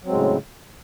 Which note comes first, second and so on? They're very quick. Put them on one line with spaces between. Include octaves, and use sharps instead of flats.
F#3 C4 G#3 A2 C#3